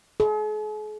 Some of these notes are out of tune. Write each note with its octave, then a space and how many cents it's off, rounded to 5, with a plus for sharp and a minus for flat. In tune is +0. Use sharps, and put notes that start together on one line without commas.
G#4 +45